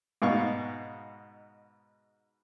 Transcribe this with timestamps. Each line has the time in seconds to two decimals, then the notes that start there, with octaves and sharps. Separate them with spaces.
0.22 G#2 B2 F5 C#6